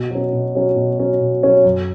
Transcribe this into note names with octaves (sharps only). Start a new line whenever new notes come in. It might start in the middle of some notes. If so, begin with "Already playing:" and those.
Already playing: B2
F#3 C#4
B2
F#3 C#4
B2
F#3 C#4
B2
F#3 C#4
F#2